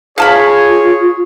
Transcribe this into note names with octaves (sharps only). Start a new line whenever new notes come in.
F4 G#4 C#5 F5 A5 B5